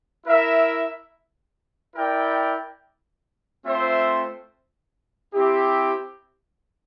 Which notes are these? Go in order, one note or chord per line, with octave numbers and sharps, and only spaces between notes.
E4 A#4 E5
E4 A#4 D5 G5
A3 C4 F4 C5 E5
C4 E4 G4